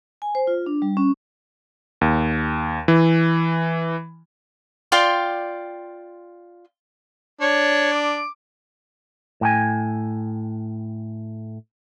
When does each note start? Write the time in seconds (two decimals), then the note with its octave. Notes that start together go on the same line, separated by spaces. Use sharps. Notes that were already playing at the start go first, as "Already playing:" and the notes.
0.22 G#5
0.35 C5
0.47 F4
0.66 D4
0.82 G3
0.97 C#4
2.01 D#2
2.88 E3
4.92 F4 D5 G5 C6
7.41 D4 C#5
7.92 D6
9.41 A2 G5 G#5